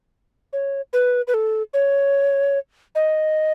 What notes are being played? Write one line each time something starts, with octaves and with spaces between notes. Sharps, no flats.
C#5
B4
B4
A4
C#5
D#5